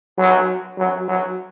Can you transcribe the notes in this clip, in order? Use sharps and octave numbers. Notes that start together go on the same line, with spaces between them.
F#3
F#3
F#3